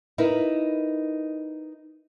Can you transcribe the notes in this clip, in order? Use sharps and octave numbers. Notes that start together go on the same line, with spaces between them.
D#4 E4 A#4 B4